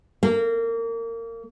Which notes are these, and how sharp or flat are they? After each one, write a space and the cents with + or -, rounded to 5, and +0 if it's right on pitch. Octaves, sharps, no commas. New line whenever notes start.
A#3 -25